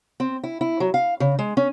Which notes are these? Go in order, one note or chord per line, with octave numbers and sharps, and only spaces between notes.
C4
E4
E4
F#3
F5
C#3
G#3
C#4